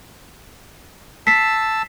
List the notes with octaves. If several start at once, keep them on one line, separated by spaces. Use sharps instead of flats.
A5 E6 B6 C7